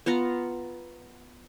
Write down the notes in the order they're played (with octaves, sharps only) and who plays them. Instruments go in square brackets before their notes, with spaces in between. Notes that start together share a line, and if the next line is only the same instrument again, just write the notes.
[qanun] B3 F4 F#5 A#5